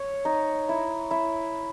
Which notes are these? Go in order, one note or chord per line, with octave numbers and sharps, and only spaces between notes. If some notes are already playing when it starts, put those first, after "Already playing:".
Already playing: C#5
D#4
E4
E4